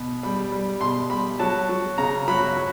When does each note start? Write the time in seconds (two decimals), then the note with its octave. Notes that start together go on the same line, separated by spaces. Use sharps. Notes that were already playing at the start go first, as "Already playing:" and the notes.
Already playing: B2
0.23 G3 B5
0.52 G3
0.81 B2 C6
1.10 G3 B5
1.39 F#3 A5
1.69 F#3
1.98 C#3 A#5
2.28 F#3 B5
2.56 F#3